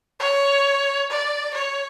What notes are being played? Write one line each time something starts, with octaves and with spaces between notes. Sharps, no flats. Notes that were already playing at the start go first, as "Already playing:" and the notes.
C#5
D5
C#5